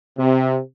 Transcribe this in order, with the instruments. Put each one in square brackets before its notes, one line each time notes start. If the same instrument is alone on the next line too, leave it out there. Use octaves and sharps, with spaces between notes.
[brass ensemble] C3